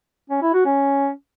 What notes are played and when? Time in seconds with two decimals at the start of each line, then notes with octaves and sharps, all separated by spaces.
0.30 C#4
0.42 E4
0.54 F#4
0.66 C#4